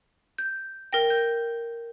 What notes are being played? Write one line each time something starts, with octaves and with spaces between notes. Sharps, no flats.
G6
A#4 G5 A#6
G6